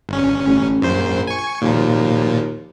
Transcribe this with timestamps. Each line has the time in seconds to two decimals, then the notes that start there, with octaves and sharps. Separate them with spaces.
0.09 G1 C#4
0.47 A1
0.82 A#1 F#2 C5
1.27 G#5 C#6
1.62 D#2 A#2 F3